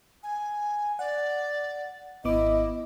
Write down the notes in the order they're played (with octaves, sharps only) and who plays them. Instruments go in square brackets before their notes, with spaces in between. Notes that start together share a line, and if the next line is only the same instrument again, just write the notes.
[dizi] G#5
[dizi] D5 [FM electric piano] F#5
[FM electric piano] G#1 B3 D6 [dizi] E4 [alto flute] D#5